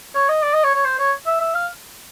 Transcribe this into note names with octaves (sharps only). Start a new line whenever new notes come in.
C#5
D#5
D5
D#5
C#5
C#5
C5
C#5
E5
E5
F5